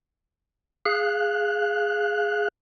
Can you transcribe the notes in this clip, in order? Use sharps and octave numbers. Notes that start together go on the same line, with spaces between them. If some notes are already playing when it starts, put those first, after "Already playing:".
G#4 F5 F#6